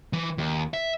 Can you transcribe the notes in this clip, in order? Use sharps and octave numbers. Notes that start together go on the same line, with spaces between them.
E3
D#2
E5